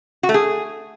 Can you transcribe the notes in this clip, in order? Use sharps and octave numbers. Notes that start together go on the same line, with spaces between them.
F#4
A3
G#4